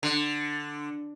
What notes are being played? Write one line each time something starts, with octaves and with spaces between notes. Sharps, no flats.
D3